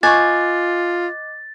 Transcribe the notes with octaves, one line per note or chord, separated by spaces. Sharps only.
F4 D#5 G#5 C#6 D6 F#6 A6